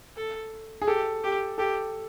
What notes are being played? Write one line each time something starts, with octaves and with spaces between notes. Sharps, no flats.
A4
G#4
G4 A4
G4
G4 A4